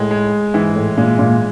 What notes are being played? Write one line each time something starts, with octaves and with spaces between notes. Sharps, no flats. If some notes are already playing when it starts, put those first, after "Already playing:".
Already playing: A2 G#3
G#3
G#2 E3
A2
A#2 G#3
A#2